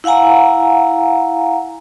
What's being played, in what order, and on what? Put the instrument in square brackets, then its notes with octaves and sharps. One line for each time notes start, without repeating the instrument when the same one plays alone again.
[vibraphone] E4 F5 F#5 G#5 A#5